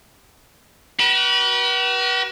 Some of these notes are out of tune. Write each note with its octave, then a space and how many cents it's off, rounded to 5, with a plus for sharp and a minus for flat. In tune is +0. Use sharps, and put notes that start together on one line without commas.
F#4 +45 B4 -35